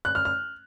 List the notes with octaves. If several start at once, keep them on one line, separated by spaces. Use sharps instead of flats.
F#6
F6
F6